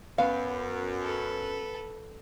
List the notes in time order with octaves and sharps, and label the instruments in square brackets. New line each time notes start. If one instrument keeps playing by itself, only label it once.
[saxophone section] F#2 [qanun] B3 [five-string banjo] F5
[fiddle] A4 B4